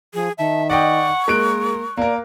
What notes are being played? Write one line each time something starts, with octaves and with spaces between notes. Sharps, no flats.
F3 G#4
D#3 E5 A5
D5 D#5 F#5 G5 C#6
G#3 A#3 A#4 F#6 D7
A#3 A#4 D5